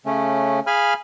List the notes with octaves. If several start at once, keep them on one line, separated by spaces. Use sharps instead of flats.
C#3 A3 C#4
G#4 F5 G#5 B5 F6